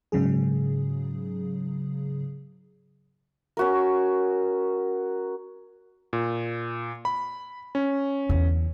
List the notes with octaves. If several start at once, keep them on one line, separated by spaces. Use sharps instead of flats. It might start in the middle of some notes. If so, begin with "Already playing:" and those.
G#2 C#3 F#3 G#4
C#4 F#4 A#4
A#2
B5
C#4
E2 D3